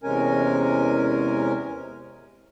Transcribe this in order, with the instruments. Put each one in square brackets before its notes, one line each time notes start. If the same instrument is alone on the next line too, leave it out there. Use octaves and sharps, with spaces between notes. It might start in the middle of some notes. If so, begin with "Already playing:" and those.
[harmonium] E2 C3 G#3 C#4 A#4 G#5